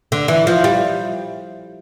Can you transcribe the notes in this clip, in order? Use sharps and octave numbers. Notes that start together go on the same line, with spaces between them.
D3
E3
F3
G3